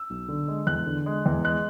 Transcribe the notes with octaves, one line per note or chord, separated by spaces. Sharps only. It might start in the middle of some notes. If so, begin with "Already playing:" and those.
Already playing: E6
B1
D3
G#3
E2 F#6
D3
G#3
E2
G#3 F#6